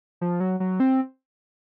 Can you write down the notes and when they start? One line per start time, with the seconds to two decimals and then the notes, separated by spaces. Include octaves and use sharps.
0.21 F3
0.40 F#3
0.60 F#3
0.80 C4